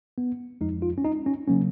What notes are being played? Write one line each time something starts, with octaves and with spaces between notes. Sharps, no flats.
B3
F2 F3 G#3 D#4
F4
C#4
D#4
C#4
C#3 F#3 A#3 C#4